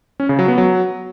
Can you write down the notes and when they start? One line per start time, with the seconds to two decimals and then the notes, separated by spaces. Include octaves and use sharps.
0.20 C#4
0.29 C#3
0.39 F#3
0.48 B3
0.58 F#3